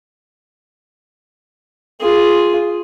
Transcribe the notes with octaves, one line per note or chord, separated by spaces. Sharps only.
F4 G#4